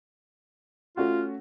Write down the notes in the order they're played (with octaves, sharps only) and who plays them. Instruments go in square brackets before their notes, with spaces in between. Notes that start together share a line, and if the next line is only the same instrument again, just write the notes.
[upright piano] A3 C#4 F#4 [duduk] F4